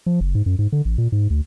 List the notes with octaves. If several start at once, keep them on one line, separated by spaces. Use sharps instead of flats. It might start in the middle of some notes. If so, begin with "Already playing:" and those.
F3
F#1
G#2
F#2
G#2
D3
A1
A#2
G#2
D2